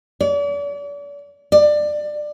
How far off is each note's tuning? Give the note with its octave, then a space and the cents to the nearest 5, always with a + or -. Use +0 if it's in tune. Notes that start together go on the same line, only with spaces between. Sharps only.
D5 -40
D5 +20